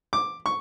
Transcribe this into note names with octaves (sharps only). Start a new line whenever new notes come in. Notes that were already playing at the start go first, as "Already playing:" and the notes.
D6
C#6